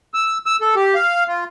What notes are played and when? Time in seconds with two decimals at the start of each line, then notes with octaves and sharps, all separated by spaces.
0.14 E6
0.46 E6
0.61 A4
0.76 G4
0.95 F5
1.28 F4